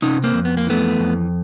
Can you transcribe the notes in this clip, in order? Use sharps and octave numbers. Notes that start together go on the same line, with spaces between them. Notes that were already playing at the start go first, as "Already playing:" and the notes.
C3 C#4 D#4
A#3 C4
F2
B3
A#3
E3 A3 B3
F2